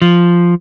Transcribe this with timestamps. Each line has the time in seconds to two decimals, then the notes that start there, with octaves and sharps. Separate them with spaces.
0.02 F3